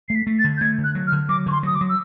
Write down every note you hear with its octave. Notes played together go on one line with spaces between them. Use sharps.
A3 C7
B6
A3
A6
D3
G6
A3 G#6
D3
F#6
F#3
F6
D3
F#3 D6
D3 C#6
C6
F#3 D#6
D6
F#3
E6